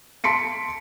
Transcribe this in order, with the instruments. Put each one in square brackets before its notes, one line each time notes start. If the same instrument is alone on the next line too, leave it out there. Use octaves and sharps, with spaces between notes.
[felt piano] A5 C6 B6 C#7 D7